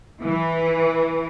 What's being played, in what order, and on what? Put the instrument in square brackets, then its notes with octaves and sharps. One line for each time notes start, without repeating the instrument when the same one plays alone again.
[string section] E3